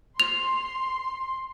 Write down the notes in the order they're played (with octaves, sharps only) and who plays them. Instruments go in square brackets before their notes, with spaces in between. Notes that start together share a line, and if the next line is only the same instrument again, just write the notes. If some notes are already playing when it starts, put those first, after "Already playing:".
[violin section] C6 [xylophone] F7